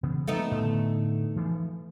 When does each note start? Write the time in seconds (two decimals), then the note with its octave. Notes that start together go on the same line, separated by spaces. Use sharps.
0.03 C#3 E3 B3
0.28 F3 G3 A3 B3 C4 D#4
0.51 A2 D3
1.36 E3 F3